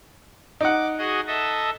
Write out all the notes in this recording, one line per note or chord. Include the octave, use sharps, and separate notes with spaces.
D#4 F#5 D6
F#4 G#4 D#5
A4 D#5 E5